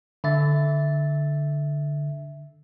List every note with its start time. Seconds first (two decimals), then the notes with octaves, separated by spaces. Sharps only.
0.24 D3 E5 A6